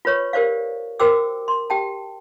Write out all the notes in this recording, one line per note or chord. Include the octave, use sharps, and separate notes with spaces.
F4 B4 C#5 C#6
G4 A#4 C5 D5 F5
F#4 A#4 C5 G5 D6 E6
C6
G4 G5 A5